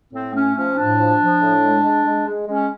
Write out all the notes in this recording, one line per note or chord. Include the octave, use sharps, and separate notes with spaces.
A2 C4
A3 C#4
F3 C#4
A2 D4
F3
F3
A2
G#3
G#3
G#3
G#3
G#3 C#4